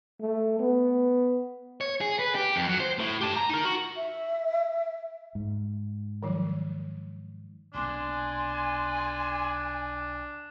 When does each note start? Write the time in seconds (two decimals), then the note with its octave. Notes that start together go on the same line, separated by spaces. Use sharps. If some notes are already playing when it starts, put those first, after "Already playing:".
0.21 A3
0.59 B3
1.81 C#5
2.01 G#4
2.19 B4
2.35 G4
2.56 F2
2.67 F#3
2.80 C5
2.99 A2
3.21 G4 A5
3.36 A#5
3.49 D#4 A#4
3.65 F#4
3.96 E5
5.35 G#2
6.23 D#3 F3 F#3
7.74 B1 C3 A#3 D4 G#5 C6